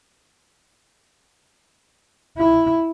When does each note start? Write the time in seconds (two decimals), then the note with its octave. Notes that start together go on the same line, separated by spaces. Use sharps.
2.37 E4